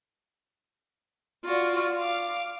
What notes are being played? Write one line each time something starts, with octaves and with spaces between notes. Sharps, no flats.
F4 F#4 D5
F5 D6